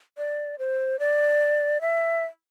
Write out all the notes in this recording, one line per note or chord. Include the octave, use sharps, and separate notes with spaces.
D5
C5
D5
E5